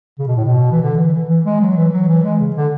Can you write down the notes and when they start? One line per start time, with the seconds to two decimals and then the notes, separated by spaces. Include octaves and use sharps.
0.19 C#3
0.27 B2
0.36 A2
0.44 B2
0.72 E3
0.82 D3
0.97 E3
1.13 E3
1.29 E3
1.45 G#3
1.61 F#3
1.77 E3
1.93 F#3
2.08 E3
2.24 G#3
2.40 C#3
2.56 D3